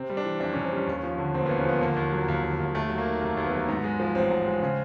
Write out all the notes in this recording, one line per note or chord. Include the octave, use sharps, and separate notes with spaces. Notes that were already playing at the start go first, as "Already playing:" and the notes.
Already playing: C3 C4
G3
D4
E3
F2 D4
C3 C#4
C4
G3 C#4
D#2
F3
D3
E1 C4
A#3
B3
D#2
C#4
F3 B3
D3 A#3
D#2
F#3
D#2
D3
D#2
D#2 A3
F#3
A#3
D#3
F1 A#3
D#2
B3
F#3
G#2
G#3
F3
A1 C4
G#2
G#3
C#3